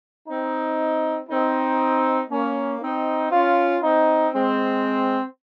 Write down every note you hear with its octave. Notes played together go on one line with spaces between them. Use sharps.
C4 D#4
C4 D#4
A#3 C#4
C4 D#4
C#4 F4
C4 D#4
G#3 C4